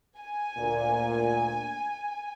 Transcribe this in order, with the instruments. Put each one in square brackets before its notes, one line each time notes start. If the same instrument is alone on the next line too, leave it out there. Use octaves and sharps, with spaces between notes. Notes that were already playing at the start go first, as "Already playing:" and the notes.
[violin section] G#5
[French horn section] D2 A#2